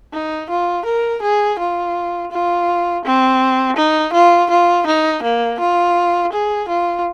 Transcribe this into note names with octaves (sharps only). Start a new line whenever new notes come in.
D#4
F4
A#4
G#4
F4
F4
C4
D#4
F4
F4
D#4
A#3
F4
G#4
F4